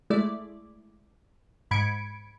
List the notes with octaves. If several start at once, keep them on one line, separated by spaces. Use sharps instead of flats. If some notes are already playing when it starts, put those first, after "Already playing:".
G#3 A3 E4 D5
G#2 B5 G#6 C#7 D7